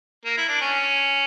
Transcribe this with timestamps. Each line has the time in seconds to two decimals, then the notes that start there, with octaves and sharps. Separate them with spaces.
0.25 A#3
0.37 E4
0.49 D4
0.61 C#4